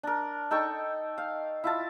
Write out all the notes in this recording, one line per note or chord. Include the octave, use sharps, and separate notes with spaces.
D4 A#4
D#4 A4 G5 C#6
F5
E4 F4 A5